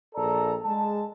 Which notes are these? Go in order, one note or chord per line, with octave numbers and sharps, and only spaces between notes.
A#1 A4 D5 A#5
G#3 A5